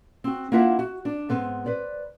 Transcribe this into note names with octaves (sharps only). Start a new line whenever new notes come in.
C4 F#4
A#3 D4 E4 F4 E5 F#5
F#4
D4
G#2 B3 C4
B4 C5 D5